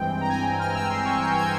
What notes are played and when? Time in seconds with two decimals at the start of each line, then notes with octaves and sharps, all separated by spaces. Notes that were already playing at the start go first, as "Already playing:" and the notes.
Already playing: G2 E3 G#3 C4 G5
0.21 A#5
0.29 G#5
0.59 F6
0.75 E6
0.90 C6
1.05 C#6
1.21 G6
1.36 G#6